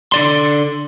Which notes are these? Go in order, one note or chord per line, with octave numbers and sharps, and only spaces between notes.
D3 D5 C6